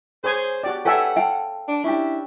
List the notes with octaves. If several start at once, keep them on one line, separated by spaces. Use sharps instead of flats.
G#4 C5 C#5 G#5
F#4 G4 D5
G4 A4 B4 C#5 E5 F#5 G#5
F5 G5 A5
D4
C#4 D4 E4 G4